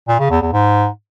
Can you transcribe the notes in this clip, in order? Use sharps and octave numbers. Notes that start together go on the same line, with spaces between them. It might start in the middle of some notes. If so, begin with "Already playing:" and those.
A#2
C#3
E2
E2
G#2